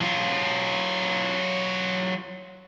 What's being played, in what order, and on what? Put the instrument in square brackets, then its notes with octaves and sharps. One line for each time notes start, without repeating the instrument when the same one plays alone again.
[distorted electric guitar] F#3 F4